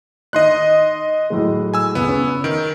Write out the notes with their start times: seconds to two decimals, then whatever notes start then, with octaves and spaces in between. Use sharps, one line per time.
0.33 D#3 D#4 D#5 C6 F#6
1.30 A2 F#3 G#3
1.74 G#5 E6
1.95 C#2 B3
2.08 C#4
2.44 D#3 D7